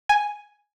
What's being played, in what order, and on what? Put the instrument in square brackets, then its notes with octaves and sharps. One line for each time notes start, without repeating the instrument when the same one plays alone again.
[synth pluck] G#5